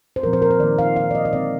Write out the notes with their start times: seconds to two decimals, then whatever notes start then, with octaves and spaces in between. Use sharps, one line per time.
0.16 C5
0.23 A#2 F3 C4 A#4
0.33 C5
0.42 A#4
0.51 C5
0.60 D#3 A#3 D5
0.79 F5
0.96 D#3 A#3 F5
1.11 D5
1.15 D#5
1.25 D#5
1.33 D3 G#3 C4 D5